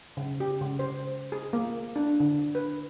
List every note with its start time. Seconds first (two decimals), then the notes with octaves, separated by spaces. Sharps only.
0.17 C#3
0.40 G4
0.61 C#3
0.79 C5
1.32 G#4
1.53 A#3
1.96 D4
2.20 D3
2.55 B4